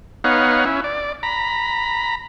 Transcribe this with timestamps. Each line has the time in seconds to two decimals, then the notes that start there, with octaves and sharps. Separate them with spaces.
0.24 B3 D#4 C#5 F5 F#5
0.65 C#4 E4
0.84 D5
1.23 A#5 B5